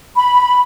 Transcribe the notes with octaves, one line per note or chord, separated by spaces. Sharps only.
B5